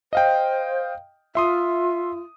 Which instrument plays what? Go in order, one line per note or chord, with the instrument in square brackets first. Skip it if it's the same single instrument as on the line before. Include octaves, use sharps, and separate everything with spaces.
[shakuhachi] C5 [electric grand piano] D#5 F5 G5
[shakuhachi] F4 [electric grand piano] E5 C6 D#6